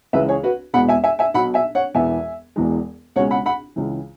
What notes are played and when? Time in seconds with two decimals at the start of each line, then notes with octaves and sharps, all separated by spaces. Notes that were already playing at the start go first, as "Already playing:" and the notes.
0.13 C#2 C#3 E3 G#3 B4 E5
0.29 G#4 C#5
0.44 F#4 B4
0.73 E1 E2 B2 G#3 B3 F#5 B5
0.88 E5 G#5
1.04 E5 G#5
1.19 E5 G#5
1.34 B1 B2 F#3 F#5 B5
1.54 E5 G#5
1.75 C#5 F#5
1.94 E1 E2 E3 B3 E5 G#5
2.56 E1 E2 E3 G#3
3.16 C#2 B2 G#3 C#4 C#5 F#5
3.31 F#5 B5
3.46 F#5 B5
3.76 C#2 C#3 E3